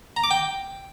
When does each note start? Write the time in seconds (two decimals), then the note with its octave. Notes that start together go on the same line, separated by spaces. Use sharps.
0.17 A#5
0.24 D6
0.31 G5